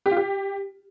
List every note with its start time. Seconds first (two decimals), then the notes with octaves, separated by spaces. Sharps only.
0.06 G4
0.11 F4
0.17 G4